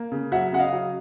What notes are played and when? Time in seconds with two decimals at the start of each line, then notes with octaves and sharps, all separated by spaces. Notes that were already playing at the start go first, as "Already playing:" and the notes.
Already playing: A#3
0.12 C#3
0.32 F#3 E5 F#5
0.52 C#3 F#5
0.59 D#5 F5
0.73 F#3